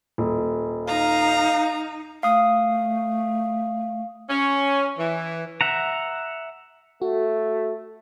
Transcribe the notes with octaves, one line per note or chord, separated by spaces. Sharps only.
D#1
D#4 F5 A#5
A3 F5 D#6
C#4
E3
E5 F#5 A#5
A3 F#4